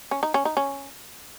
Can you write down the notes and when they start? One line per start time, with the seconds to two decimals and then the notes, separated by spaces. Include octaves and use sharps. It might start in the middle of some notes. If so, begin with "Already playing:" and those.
0.11 C#4
0.23 D#4
0.34 C#4
0.45 D#4
0.57 C#4